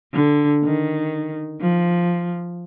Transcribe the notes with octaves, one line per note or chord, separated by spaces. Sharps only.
D3
D#3
F3